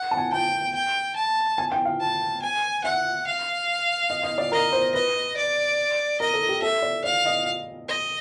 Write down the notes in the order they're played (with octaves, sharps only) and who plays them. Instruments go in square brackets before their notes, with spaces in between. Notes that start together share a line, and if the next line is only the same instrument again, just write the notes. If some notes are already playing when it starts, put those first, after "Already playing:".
Already playing: [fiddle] F#5
[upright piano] A5
G#5
[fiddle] G5 [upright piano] A5
[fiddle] G5
A5
[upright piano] G#5
G5
F5
[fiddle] A5
G#5
[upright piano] E5 [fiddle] F#5
[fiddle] F5
[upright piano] D#5
D#5
D5
[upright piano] A#4 [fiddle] D#5
[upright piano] C5
[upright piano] B4 [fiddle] D#5
[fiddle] D5
[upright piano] A#4 [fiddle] D#5
[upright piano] A4
G4
[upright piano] A4 [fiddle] E5
[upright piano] D5
[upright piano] D5 [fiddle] F5
[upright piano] D#5
[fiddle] D#5